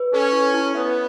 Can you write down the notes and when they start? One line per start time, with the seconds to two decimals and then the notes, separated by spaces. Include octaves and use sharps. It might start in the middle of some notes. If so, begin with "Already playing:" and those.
Already playing: B4
0.13 C#4 A4
0.33 E4
0.54 E4
0.74 B3 E5